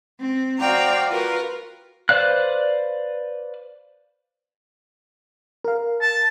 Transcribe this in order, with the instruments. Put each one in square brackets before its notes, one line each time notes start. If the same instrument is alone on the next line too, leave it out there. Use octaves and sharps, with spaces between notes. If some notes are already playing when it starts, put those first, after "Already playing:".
[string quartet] C4
F#4 C5 D5 F5 G5 A#5
F4 F#4 A#4 B4
[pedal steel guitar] B4 C5 D5 F5 F#6
[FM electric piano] A#4 F5
[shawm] A5